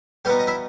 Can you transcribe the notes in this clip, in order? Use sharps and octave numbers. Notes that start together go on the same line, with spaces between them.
B2 G3 B3 D#4 G4
D#5
E4 E5